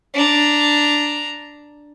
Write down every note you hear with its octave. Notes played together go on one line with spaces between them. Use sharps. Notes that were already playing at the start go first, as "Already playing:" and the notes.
D4 A#5